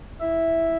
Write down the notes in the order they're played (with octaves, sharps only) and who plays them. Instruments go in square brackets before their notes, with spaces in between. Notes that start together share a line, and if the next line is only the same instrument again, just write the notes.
[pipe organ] E4 E5